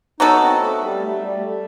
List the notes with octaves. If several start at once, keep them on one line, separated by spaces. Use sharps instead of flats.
F#3 B3 D#4 F#4 A4
C4
A3
G3
A3
G3
A3